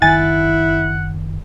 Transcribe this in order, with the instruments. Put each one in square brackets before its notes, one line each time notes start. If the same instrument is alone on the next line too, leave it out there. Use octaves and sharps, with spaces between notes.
[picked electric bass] F#1 D#3 [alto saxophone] E4 [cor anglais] F#5 [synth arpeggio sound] G#5 A6